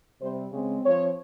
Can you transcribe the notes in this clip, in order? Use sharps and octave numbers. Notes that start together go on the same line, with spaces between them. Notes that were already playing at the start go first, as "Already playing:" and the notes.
C3 G3 C4 C5
C#3 G#3 C4
F3 C4 C#5